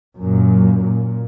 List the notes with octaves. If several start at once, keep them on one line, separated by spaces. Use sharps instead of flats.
F#2 A#2
A#2